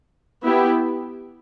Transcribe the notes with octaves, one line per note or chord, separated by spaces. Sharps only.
B3 E4 G4